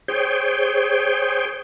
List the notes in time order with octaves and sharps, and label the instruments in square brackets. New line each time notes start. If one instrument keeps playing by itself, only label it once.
[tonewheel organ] G#4 C5 C#5 G5